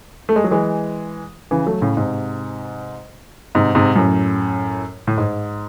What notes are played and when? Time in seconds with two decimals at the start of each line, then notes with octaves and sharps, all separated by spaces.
0.29 A3
0.36 G#3
0.44 F#3
0.51 E3 G#3
1.51 C#3 E3
1.67 F#3 A3
1.81 A2 C#3
1.97 G#2 C3
3.55 G#2 C3
3.75 G#2 C3
3.95 F#2 A2
5.07 A2
5.18 G#2